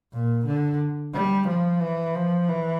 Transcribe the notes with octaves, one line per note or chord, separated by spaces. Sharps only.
A#2
D3
G3
F3
E3
F3
E3